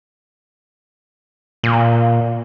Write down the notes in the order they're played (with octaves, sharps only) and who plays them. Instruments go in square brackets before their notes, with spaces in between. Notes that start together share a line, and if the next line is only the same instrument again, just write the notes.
[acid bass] A#2